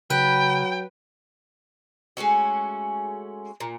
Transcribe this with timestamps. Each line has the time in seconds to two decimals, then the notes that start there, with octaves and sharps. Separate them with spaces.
0.10 C#3 F#3 B4 G5
2.17 G#3 A3 C#4 F#4
3.60 A#2